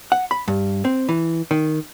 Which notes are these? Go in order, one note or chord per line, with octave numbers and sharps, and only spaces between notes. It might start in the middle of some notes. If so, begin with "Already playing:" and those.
F#5
B5
G2
C4
E3
D#3